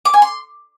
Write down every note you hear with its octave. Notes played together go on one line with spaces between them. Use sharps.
D6
G#5
C6